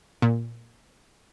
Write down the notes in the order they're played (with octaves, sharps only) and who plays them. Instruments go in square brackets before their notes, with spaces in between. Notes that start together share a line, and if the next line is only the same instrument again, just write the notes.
[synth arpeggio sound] A#2